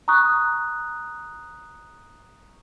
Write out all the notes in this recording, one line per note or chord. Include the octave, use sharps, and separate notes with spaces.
A#5 C#6 D#6 F#6